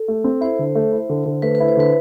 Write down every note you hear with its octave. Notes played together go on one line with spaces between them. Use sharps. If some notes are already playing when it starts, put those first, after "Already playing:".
Already playing: A4
A3
C4
E4 C5
D3
A3
E4
D3
D3
A3 B4
B4
E4
C5
D3 B4